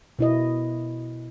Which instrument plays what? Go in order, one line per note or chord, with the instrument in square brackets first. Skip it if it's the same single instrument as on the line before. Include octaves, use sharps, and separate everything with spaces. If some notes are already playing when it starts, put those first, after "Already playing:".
[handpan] B2 E4 D#5